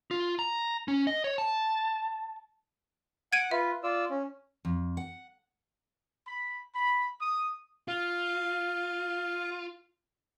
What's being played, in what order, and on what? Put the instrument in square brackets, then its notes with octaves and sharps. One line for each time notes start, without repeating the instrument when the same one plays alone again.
[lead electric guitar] F4
A#5
C#4
D#5
C#5
A5
[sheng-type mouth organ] F#5 F#6 [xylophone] G#6 D7 D#7
[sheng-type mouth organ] F4 B4 [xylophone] E5
[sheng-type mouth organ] F4 D5 E6
C#4
[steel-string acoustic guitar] F2
F#5
[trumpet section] B5
B5
D#6
[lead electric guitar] F4 [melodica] F5